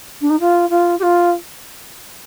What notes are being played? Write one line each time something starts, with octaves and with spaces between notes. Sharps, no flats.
D4
D#4
F4
F4
G4
F4